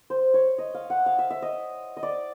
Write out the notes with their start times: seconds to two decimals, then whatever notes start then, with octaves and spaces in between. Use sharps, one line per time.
0.10 C5
0.34 C#5
0.58 D#5
0.74 F5
0.90 F#5
1.06 F5
1.19 E5
1.30 E5
1.42 D#5
1.97 D#5
2.03 D5